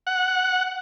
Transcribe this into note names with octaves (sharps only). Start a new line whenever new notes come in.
F#5